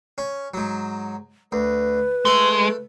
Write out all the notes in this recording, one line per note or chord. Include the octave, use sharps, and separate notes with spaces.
C#4
G#2 F#3
D2 B4
G#3 A3 A4